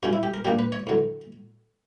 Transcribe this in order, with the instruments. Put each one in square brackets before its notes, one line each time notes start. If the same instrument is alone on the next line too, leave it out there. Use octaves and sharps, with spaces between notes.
[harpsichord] G2 F#3 C#4 F#4
E4
G4
A#4
A#2 F#3 A#3 D4 G4
B4
C#5
E2 D3 F#3